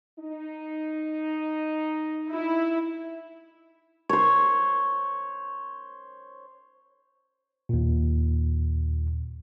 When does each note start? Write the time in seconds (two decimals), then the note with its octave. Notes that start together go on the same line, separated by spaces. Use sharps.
0.20 D#4
2.33 E4
4.09 C5 C#5
7.69 D#2 A#2